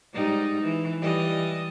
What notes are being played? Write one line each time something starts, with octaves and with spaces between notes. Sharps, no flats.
G#2 G3 D#4
E3
E3 G3 D#5